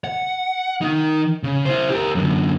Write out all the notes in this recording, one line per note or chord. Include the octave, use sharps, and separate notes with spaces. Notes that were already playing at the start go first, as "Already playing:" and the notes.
F#5
D#3 D#4
C#3
E4 C5
G4 A#4
F#2 D3